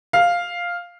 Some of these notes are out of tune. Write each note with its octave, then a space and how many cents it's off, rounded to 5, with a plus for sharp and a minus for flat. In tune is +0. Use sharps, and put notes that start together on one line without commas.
F5 +0